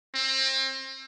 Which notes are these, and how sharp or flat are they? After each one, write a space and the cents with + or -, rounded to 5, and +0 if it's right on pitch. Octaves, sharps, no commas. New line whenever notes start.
C4 +30